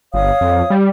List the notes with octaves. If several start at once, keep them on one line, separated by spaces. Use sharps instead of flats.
G1 C#5 F5 D#6
F2
G3